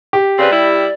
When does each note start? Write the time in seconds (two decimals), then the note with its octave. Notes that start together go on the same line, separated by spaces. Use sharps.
0.13 G4
0.38 C#3 C4 B4 D5
0.51 G3 E4